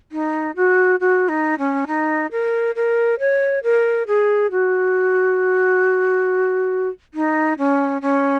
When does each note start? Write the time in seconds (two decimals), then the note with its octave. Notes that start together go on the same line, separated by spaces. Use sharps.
0.12 D#4
0.56 F#4
1.00 F#4
1.28 D#4
1.58 C#4
1.87 D#4
2.31 A#4
2.75 A#4
3.19 C#5
3.63 A#4
4.07 G#4
4.51 F#4
7.14 D#4
7.58 C#4
8.01 C#4